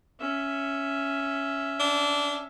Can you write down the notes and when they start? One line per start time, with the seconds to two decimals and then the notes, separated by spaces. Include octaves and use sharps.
0.20 C#4 E5
1.80 D4